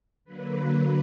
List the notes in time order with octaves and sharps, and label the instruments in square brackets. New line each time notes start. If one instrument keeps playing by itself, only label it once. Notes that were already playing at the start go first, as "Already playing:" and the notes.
[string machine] D3 F#3 A#3 B4